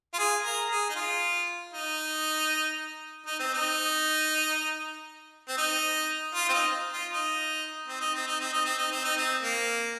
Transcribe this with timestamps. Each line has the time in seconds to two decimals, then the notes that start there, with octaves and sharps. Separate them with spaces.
0.13 F4
0.18 G#4
0.43 A#4
0.70 G#4
0.89 D#4
0.95 F4
1.73 D#4
3.26 D#4
3.39 C4
3.53 D#4
5.48 C4
5.57 D#4
6.35 F4
6.49 C4
6.53 D#4
6.92 F4
7.12 D#4
7.88 C4
8.01 D#4
8.14 C4
8.27 D#4
8.40 C4
8.53 D#4
8.65 C4
8.78 D#4
8.92 C4
9.04 D#4
9.16 C4
9.42 A#3